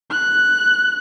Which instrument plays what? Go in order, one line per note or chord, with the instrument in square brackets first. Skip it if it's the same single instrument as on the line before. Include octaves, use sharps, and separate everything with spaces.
[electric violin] F#6